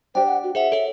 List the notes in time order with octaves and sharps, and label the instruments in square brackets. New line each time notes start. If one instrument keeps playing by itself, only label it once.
[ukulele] D4 G4 [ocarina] C5 [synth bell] G5
[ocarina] F#5
F#4
[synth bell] G#4 C5 F#5 [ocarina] E5
[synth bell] A4 C#5